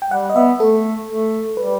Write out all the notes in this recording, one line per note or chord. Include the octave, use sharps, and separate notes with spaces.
G5
G3 F#5
D#5
B3 E5
A3 A4
A3
G3 B4